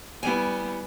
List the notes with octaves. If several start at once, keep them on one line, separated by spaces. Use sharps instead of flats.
G3 B3 E4 G#5